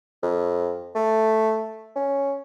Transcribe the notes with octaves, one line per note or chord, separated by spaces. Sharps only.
F2
A3
C#4